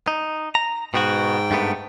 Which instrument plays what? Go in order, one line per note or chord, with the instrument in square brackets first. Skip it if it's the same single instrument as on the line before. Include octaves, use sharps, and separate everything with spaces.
[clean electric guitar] D#4
A#5
[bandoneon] G#2 G5 [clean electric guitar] B2 B3 F#4
[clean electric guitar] G2 A3 B3